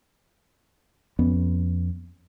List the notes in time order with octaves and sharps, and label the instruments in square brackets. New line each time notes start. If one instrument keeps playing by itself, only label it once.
[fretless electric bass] F2 B3 C#4